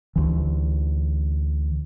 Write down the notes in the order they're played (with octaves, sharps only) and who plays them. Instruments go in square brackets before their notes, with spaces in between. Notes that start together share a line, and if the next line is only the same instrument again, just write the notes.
[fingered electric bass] D2 E3